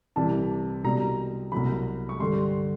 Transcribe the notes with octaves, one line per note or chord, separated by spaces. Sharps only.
C2 C3 E3 G3 A5
C2 B2 G3 A#5
C2 B2 F#3 B5
C#6
G2 D3 G3 C6